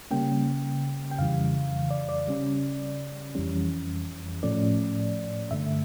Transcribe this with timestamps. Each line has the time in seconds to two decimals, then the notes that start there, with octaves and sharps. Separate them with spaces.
0.11 C#3 G3 A#3 C#4 G5
1.11 G5
1.19 F2 C#3 E3 G3 F5
1.90 D5
2.09 D5
2.27 C#3 G3 C#4
3.35 F2 E3 G3 C#4
4.43 A2 F3 A3 C#4 D5
5.51 G2 D3 A3 E5